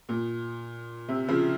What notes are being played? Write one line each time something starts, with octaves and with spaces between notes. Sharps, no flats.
A#2
C3
C#3 F3